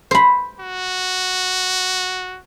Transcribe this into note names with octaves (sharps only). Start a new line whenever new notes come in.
C5 B5
F#4